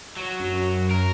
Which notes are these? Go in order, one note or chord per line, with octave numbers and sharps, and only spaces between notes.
F#3
F#2
A#4